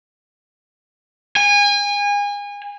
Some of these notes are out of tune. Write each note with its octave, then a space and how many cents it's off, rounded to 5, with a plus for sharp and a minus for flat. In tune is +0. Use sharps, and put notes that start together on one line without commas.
G#5 -30